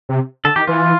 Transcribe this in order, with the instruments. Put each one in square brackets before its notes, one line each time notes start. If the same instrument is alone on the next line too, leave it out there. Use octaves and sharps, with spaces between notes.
[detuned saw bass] C3
[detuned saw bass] D3 [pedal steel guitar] A4
[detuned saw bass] D#3 [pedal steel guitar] G4
[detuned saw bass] E3 [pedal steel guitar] F4